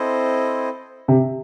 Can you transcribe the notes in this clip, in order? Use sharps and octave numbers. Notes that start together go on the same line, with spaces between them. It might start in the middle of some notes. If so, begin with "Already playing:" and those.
Already playing: C4 E4 A4 C5 D#5
C3